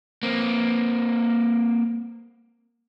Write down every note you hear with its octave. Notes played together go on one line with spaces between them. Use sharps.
A#3 C4